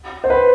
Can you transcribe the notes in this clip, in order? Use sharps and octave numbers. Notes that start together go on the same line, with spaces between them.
C5
B4